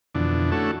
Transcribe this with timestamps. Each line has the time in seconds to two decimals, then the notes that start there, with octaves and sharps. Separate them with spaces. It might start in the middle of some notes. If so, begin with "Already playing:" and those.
0.15 F2 B2 D3 E3 D4
0.52 A3 C#4 D4 E4 F#4 A4